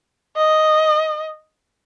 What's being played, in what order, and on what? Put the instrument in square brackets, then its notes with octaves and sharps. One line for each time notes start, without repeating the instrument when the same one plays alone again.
[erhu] D#5